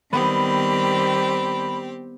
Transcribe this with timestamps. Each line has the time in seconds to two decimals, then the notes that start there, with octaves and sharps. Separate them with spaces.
0.13 D#3 G3 B3 C4 G4 B5